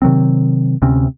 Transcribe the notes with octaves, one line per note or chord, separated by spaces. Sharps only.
C3 D#3 F#3 C4
D2 C3 C4 C#4